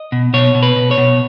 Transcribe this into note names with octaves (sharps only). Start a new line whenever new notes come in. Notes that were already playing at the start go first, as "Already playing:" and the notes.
Already playing: D#5
B2
B2 C#5
B2
B4
B2
C#5
B2